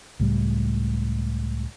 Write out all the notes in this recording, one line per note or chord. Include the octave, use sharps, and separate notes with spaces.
C#2 A2 G3